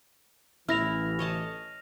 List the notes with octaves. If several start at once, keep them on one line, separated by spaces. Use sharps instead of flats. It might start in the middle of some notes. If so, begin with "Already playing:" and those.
A1 E3 E4 F6 A#6 F7
C#5 D#5 A5